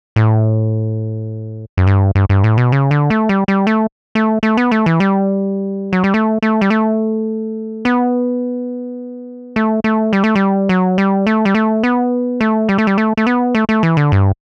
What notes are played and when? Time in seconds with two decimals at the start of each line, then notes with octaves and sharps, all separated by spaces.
0.16 A2
1.77 F#2
1.87 G2
2.15 G2
2.29 G2
2.44 A2
2.57 B2
2.72 C#3
2.91 D3
3.10 A3
3.29 G3
3.48 G3
3.67 A3
4.15 A3
4.43 A3
4.57 B3
4.71 A3
4.86 E3
5.00 G3
5.93 F#3
6.04 G3
6.14 A3
6.42 A3
6.61 G3
6.70 A3
7.85 B3
9.56 A3
9.84 A3
10.13 G3
10.24 A3
10.35 G3
10.69 F#3
10.98 G3
11.27 A3
11.45 G3
11.55 A3
11.84 B3
12.41 A3
12.69 G3
12.78 A3
12.87 G3
12.98 A3
13.17 A3
13.27 B3
13.55 A3
13.69 A3
13.83 E3
13.97 D3
14.12 G2